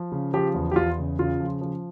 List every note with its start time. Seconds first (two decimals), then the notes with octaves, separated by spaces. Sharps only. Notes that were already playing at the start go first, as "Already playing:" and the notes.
Already playing: F3
0.12 C#3
0.34 F3 G4
0.55 E2
0.71 G4
0.76 E2 F4
0.98 C#3
1.19 C#3 F4
1.40 F3
1.61 F3